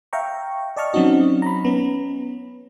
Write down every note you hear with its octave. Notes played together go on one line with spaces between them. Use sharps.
E5 F5 G5 A#5 C#6
D5 D#5 A5 C#6 F6
F#3 C4 C#4 D#4 F#4 D#5
A#5 B5
B3 C#4